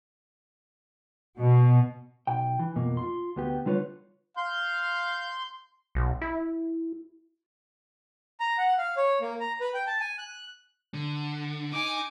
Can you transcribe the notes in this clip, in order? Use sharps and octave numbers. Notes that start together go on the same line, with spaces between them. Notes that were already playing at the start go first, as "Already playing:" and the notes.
B2
B1 G5
E3
F2 B2 A#3
F4 C6
D2 B3 G4
D3 G3 F4 B4 C#5
F5 C6 G6
B1
E4
A#5
F#5
F5
C#5
A#3
A#5
B4
G5
A5
G#5
F#6
D3
D#4 G#5 D6